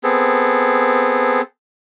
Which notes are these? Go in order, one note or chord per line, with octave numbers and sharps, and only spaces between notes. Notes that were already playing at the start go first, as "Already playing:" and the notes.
B3 C4 G#4 A4